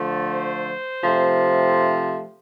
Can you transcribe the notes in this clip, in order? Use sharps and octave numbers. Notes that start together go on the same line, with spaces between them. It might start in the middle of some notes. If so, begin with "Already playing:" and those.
Already playing: D3 F3 A3
C5
C3 F3 A3